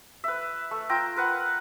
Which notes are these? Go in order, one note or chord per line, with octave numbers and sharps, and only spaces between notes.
B4 E5
A3
F4 G5 A#5 E6
A#4 B4 F#5